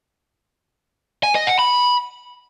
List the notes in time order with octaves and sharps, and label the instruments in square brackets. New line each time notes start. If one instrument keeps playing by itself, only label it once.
[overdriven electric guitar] G#5
D#5
F#5
B5